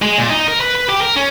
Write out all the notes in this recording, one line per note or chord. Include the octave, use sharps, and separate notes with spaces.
G#3
A#2
D#4
A#4
B4
B4
G4
A#4
C#4